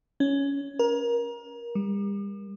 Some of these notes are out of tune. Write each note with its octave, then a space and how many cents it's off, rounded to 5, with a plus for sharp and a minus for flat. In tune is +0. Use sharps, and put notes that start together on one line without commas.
C#4 +10
A#4 +25
G3 +40